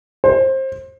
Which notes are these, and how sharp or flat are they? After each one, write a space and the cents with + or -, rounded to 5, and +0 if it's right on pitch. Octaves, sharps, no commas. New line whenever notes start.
C5 +25